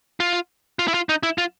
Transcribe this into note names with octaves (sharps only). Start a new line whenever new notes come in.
F4
F4
E4
F4
D#4
E4
F4